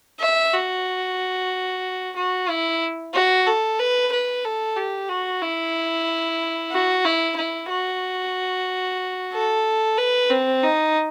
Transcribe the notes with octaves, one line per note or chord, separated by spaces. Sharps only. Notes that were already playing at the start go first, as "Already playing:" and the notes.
E5
F#4
F#4
E4
F#4
A4
B4
B4
A4
G4
F#4
E4
F#4
E4
E4
F#4
A4
B4
C4
D#4